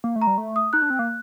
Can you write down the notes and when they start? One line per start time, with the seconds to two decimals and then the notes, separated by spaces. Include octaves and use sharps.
0.04 A#3
0.16 A3
0.22 A#5
0.27 G3
0.38 A3
0.56 D#6
0.73 D#4 F#6
0.82 D4
0.90 C4
0.99 A#3